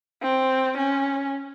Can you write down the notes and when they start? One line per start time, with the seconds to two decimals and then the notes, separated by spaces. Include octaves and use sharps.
0.22 C4
0.78 C#4